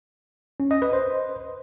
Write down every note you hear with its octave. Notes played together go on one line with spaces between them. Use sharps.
C#4
D#5
B4
C5